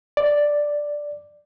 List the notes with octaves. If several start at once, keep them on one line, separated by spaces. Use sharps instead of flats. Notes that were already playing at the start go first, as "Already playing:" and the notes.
D5